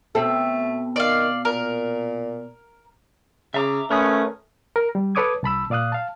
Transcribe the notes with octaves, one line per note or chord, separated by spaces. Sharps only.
B2 A3 C4 A4
D#3 D5 F5
A#2 A#4
C#3 E5 A#5 D6
A3 C#4 A#4 B4 C#5 D#6
A#4
G3
A4 B4 C#5 D6 D#6 G#6
C2 A5 B5 E6
A#2 D5 F5 D#6 F#6
F5 A5